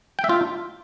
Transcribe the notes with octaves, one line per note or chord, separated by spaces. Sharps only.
G5
E5
F4